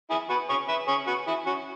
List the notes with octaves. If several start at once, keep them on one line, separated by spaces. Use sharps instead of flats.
E4 G#4
F#4 B4
G#4 C#5
B4 E5
G#4 C#5
F#4 B4
E4 G#4
C#4 F#4